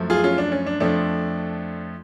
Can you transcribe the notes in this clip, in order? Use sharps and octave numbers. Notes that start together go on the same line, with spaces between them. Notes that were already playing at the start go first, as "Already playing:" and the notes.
Already playing: F#2 F3 A3
F4 G#4
C#4 F4
D4
C#4
D4
F2 F3 A3 D4